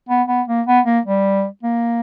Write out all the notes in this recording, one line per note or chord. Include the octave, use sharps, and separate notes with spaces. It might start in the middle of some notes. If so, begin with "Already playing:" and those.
B3
B3
A#3
B3
A#3
G3
A#3